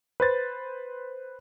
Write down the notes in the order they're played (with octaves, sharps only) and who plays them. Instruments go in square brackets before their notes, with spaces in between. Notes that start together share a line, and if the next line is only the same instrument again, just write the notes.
[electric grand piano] B4 C5 A6